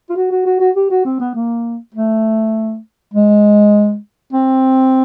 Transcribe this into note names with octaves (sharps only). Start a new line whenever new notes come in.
F4
F#4
F#4
F#4
F#4
G4
F#4
C4
B3
A#3
A3
G#3
C4